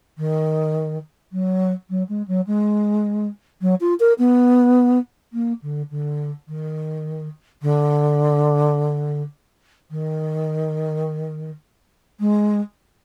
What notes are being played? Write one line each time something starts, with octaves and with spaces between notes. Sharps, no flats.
D#3
F#3
F#3
G#3
F#3
G#3
F#3
F4
A#4
B3
A#3
D3
D3
D#3
D3
D#3
G#3